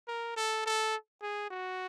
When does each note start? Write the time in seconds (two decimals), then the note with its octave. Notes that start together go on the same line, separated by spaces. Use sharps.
0.08 A#4
0.37 A4
0.66 A4
1.22 G#4
1.51 F#4